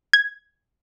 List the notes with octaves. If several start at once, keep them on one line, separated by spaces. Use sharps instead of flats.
G#6